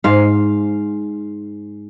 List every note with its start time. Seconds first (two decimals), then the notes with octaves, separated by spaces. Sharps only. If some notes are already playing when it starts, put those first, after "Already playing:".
0.04 G#2 F5